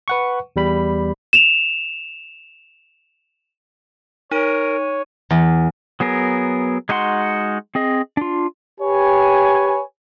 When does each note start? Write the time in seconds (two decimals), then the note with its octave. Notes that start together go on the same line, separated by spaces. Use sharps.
0.08 B4 F#5 C#6
0.56 E2 G3 B5
1.33 E7 F7
4.31 D#4 A#4 C#5 D#7
5.31 E2
6.00 F#3 B3 G#4 A#4
6.89 G#3 D#4 F#4 F#5 C6
7.75 C4 G#4 D#5
8.17 D4 F4
8.81 G4 B4 C#5 G#5